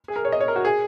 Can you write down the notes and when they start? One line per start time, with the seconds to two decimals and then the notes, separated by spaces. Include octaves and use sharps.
0.08 G#4
0.16 A#4
0.25 C#5
0.32 D#5
0.41 C#5
0.48 A#4
0.56 F#4
0.65 G#4